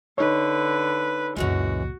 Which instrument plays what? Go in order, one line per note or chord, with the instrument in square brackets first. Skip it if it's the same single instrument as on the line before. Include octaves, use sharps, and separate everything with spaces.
[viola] D3 B4 [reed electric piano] D#4 C#5
[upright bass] C#2 A#2 [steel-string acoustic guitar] F#2 E3 G#3 [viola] F#4